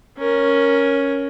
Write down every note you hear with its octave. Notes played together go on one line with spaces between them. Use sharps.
C#4 A#4